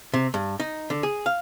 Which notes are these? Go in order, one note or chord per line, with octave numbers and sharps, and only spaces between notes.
C3
G2
D#4
D3
G#4
F5